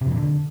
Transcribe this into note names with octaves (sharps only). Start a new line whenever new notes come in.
C3
F2
A#2
D3